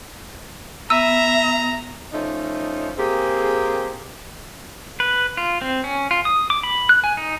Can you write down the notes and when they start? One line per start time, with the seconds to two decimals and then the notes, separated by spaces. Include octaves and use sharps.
0.90 B3 E5 A#5 E6
2.13 F3 A3 C#4 D#4
2.98 A#3 C4 G4 G#4
5.00 B4
5.37 F4
5.61 C4
5.84 C#4
6.11 F4
6.25 D#6
6.50 D6
6.63 B5
6.89 F#6
7.04 G#5
7.17 D#4